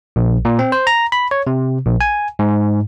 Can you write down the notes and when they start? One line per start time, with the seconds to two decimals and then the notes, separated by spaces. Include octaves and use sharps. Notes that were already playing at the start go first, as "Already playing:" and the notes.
0.16 A#1
0.45 A#2
0.59 C4
0.72 C5
0.87 A#5
1.12 B5
1.31 C#5
1.47 C3
1.86 A#1
2.01 G#5
2.39 G#2